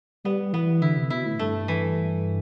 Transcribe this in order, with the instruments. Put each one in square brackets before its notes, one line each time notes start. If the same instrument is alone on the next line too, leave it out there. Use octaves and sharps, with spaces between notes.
[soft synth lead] G3 [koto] B3
[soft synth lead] E3 [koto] B3
[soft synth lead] D3 [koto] E4
[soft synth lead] C3
[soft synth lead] B2 [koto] E4
[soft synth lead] A2
[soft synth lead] G2 [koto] A3
[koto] E3